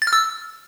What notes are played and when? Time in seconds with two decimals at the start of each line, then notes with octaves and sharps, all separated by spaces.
0.02 A6
0.07 F6
0.13 E6